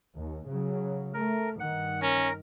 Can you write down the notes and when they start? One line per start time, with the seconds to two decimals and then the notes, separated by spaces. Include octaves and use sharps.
0.16 D#2
0.47 C#3 F#3
1.14 A3 A#4
1.60 G2 D#3 F#5
2.02 C#4 A#4 A#6